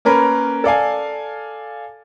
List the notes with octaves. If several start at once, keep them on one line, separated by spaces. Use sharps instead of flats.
A#3 C#4 A#4 B4
A4 D5 F5 G#5